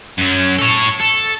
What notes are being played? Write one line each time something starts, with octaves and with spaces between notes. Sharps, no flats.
F#2 F#3
A4 C#5
A4